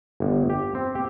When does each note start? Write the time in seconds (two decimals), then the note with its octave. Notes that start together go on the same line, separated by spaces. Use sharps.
0.20 G1
0.50 G4
0.75 C4
0.95 G4